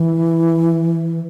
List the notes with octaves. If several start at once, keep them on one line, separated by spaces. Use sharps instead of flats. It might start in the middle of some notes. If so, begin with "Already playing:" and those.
Already playing: E3